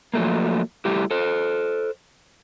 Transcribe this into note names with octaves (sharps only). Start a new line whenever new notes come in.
F3 F#3 A3 A#3
G3 A3 E4 G4
A4 C5